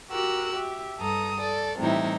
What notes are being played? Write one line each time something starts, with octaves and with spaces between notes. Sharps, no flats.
F#4 G4 A#4 E6 F#6
G4 E5
G2 A4 A#5 D#6
A4 D5
A2 C3 E3 G3 D#4 E4